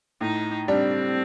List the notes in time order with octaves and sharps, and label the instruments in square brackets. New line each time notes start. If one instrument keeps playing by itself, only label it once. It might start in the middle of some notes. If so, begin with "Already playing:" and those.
[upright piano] A2 [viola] D#4
[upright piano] G3 D4 [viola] C4